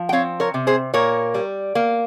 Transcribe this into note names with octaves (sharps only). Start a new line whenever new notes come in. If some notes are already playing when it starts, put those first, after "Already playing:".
Already playing: F3
G5
C4 C#5 F5
A#4 C#5
C3
G#4 C5
A#2 A#4 C#5
G3
A#3